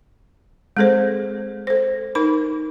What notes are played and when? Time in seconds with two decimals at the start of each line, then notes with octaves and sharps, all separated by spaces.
0.77 G#3 C4 G#4 A4 C5
1.67 A4 C5
2.15 D#4 A#4 B5